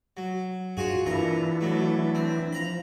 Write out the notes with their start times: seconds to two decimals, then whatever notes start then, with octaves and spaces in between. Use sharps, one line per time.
0.17 F#3
0.77 G2 F4 F#4 G#4
1.06 A#2 E3 D4 E4 A#5
1.61 F#3 A3
2.15 C4
2.53 F3 A#5 B5